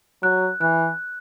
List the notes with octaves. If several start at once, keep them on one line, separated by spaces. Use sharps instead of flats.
F#3 F#6
E3 F#6